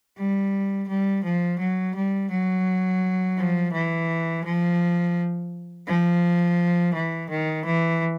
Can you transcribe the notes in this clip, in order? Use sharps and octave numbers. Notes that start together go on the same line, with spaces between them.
G3
G3
F3
F#3
G3
F#3
F3
E3
F3
F3
E3
D#3
E3